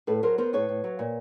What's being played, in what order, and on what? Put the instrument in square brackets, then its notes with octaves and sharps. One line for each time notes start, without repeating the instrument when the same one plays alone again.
[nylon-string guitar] A2 A4 B4
F#3 A#4 C5
B3 A#4 C5
A2 B4 C#5
A2
F#3
A#2